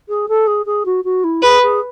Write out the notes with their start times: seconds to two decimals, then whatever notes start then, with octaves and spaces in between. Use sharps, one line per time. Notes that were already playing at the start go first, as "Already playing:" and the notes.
0.08 G#4
0.28 A4
0.47 G#4
0.66 G#4
0.85 F#4
1.04 F#4
1.24 E4
1.42 G#4 B4
1.62 G#4